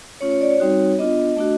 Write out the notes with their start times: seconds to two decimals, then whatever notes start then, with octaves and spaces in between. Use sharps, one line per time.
0.20 A3 C#4 F4 C#5
0.31 C#5
0.41 D5
0.50 C#5
0.60 G3 C4 D#4 F#4
0.99 B3 D4 F4 D#5
1.37 A3 D4 F#4